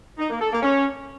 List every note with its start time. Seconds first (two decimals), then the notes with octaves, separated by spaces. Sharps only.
0.18 D#4
0.29 A#3
0.40 A4
0.51 A#3
0.62 C#4